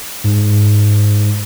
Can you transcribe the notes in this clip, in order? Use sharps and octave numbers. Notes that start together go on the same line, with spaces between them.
G#2